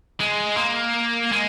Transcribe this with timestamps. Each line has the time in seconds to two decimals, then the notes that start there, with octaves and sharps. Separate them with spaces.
0.20 G#3
0.57 A#3
1.32 G#3